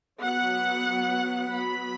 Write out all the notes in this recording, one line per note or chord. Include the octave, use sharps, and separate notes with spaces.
F#3 B3 F#5
F#3 B3 B5